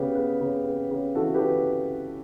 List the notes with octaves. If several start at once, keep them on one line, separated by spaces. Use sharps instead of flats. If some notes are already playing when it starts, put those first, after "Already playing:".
Already playing: C#3 B3 G4
B3
C#3
B3
C#3
E3 F#4 A4
G4 B4
E3